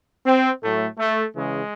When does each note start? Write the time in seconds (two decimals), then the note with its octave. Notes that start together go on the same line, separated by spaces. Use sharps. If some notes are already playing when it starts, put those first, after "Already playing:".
0.25 C4
0.62 A2 F#3 A3
0.98 A3
1.35 C#3 E3 G#3